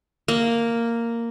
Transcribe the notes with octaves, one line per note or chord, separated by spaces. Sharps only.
A#3